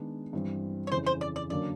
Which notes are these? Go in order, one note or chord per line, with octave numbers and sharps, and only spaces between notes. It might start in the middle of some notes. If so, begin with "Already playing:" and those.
Already playing: D#3 G#3 B3 D4
G2 E3 G3 C4
C#5
F2 C#3 E3 C5
C5
D5
D5
F#2 D3 F#3 A#3 D4 D5